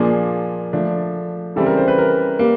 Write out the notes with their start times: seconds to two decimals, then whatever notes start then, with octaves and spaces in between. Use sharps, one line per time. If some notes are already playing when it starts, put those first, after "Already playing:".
Already playing: A#2 F3 A#3 D4 G#4
0.73 F3 A3 D4
1.56 C#3 E3 G3 C4 A4
1.66 A#4
1.77 C5
1.88 B4
1.98 A#4
2.39 G3 A#3